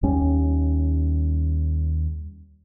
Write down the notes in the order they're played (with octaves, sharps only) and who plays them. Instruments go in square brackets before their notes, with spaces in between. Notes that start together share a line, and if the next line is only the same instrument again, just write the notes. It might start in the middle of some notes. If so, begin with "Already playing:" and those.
[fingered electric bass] D#2 G3 C#4